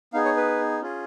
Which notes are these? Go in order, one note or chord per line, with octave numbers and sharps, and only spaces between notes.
B3 D#4 G#4 F5
C#5
B4
C#4 F4 G#4